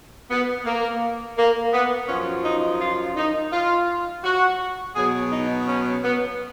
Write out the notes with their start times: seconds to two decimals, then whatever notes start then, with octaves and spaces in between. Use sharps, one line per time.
0.30 B3
0.65 A#3
1.37 A#3
1.73 B3
2.08 F#2 F3 C#4
2.44 D#4
2.81 F4
3.16 D#4
3.52 F4
4.24 F#4
4.96 B2 F#3 G#4
5.31 D#4
5.67 C#4
6.04 B3